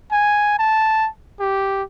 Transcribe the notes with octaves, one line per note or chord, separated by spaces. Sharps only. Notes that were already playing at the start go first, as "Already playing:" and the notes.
G#5
A5
G4